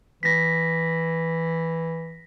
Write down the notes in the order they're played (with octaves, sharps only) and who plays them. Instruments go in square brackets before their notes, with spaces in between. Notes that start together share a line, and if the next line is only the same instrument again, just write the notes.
[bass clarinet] E3 [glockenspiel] A#6 B6